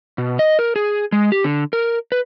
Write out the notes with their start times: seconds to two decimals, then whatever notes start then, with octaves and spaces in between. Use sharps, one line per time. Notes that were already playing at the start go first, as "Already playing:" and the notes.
0.18 B2
0.39 D#5
0.59 A#4
0.76 G#4
1.12 G#3
1.32 G4
1.44 D3
1.73 A#4
2.12 B4